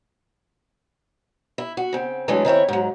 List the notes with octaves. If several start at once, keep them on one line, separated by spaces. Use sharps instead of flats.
E4
F#4
C#3 C4
E3 F#3 G#3 A3 C#4 D4
D#3 C4 E4 C#5
G#2 F#3